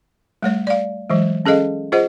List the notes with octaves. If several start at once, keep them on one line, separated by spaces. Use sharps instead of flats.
G3 A3 C#5
D5 F5
E3 F#3 G#3
C#4 G#4 A4 D#5 F5
F4 G#4 C5 D#5 F#5